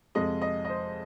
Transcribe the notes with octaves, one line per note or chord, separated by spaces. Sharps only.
F2 C3 G#3 D#5
D#5
D#5
C5